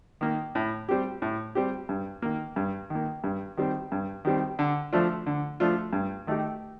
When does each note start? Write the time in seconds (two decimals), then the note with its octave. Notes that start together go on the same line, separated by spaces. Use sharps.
0.21 D#3 A#3
0.55 A2
0.89 G3 C4 G4
1.22 A2
1.55 G3 C4 G4
1.89 G2
2.22 D#3 A#3
2.56 G2
2.90 D#3
2.95 A#3
3.24 G2
3.57 D#3 G3 C4
3.92 G2
4.25 D#3 G3 C4
4.59 D3
4.93 F3 A3 D4 F4
5.26 D3
5.60 F3 A3 D4 F4
5.93 G2
6.27 D#3 A3 D#4 G4